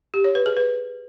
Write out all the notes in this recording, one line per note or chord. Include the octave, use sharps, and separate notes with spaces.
G4
C#5
B4
G#4
B4